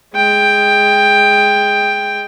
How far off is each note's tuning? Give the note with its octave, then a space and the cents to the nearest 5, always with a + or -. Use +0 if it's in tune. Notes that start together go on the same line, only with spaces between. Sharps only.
G#3 +0 G5 +10